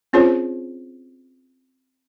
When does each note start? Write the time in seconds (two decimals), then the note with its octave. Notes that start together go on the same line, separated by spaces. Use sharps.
0.13 C4 C#4 F4 G#4 C5 C#5